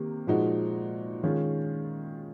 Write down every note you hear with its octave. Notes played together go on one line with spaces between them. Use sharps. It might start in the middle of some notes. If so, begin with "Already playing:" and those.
Already playing: C3 D#3 A#3
A#2 F3 G#3 D#4 F#4
D#3 G#3 C#4 F4 G#4